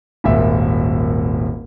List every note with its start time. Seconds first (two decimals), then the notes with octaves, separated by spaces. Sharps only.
0.24 D#1 G#1 A#2 E5